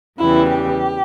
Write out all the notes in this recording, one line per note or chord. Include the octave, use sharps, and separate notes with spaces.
E2 C#3 E3 G3 E4
G4